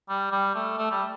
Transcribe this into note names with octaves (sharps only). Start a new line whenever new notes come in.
G3
G3
A3
A3
G3